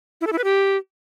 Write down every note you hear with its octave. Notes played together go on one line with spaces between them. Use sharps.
E4
A4
E4
B4
G4